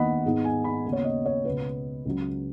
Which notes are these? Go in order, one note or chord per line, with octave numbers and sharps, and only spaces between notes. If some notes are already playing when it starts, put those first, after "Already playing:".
Already playing: D#2 D#3 B3 D#5 F#5 B5
G#2 G#3 B3 D#4
G#5
B5
D#2 C#3 B3
C#5
D#5
C#5
C#2 B2 B3 B4
C#2 C#3 F#3 C#4